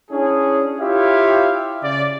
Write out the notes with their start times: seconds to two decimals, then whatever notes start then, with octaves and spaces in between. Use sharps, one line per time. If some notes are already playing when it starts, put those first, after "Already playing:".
0.11 C#4 D4 E4 G#4
0.81 E4 F4 G4 C#5 E5 F5
1.83 C#3 D5